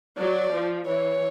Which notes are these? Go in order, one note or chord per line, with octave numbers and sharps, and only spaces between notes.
F#3 D5
F3
E3 C#5